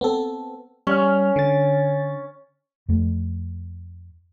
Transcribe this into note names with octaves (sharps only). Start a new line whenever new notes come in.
B3 C4 A4
G3 C#4 F6
D3 A6
F2 A3